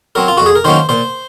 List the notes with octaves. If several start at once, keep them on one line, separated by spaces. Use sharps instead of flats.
F#3 C4 A#4
F4
F2 F#4
G#4
A#4
D#3 F#3 A#3 C#4 C5
A#2 C5